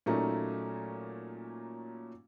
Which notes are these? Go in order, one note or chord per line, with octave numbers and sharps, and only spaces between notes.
A#2 F#3 A3 A#3 C#4 D#4